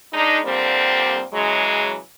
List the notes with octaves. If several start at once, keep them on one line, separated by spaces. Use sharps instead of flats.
G#3 D4 D#4
F2 D3 G3 A#3 C4
C#3 E3 F#3 G#3